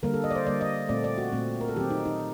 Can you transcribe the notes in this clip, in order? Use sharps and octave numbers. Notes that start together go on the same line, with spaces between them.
D3 G3 A#3 A#4
A4
D#5
D5
C5
D3 G3 A#3 D5
D#5
A#2 A3 C4 D5
D5
F#4
A#2 A3 C4
A#4
A4
D#3 F#3 C4 G4
D#4
D#4